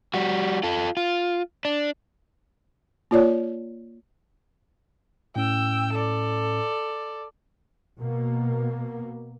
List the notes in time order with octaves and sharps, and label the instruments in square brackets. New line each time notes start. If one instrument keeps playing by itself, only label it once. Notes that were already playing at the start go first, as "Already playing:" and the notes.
[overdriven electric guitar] G3 F#4
F4 A4
F4
D4
[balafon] A#3 F4 C#5 D5
[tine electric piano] A2 C#4 [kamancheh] G5 E6
[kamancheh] A4 D5
[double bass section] B2 A#3